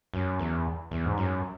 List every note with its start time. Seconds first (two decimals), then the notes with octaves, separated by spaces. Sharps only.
0.14 F#2
0.39 E2
0.91 E2
1.06 G#2
1.17 F#2